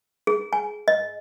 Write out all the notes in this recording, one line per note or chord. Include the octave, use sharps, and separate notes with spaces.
G#4
G#5
D#5